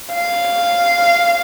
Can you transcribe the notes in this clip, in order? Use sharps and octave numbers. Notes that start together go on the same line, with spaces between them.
F5